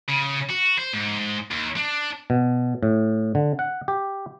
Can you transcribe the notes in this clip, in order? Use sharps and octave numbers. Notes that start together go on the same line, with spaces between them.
C#3
F#4
C5
G#2
D#2
D4
B2
A2
D3
F#5
G4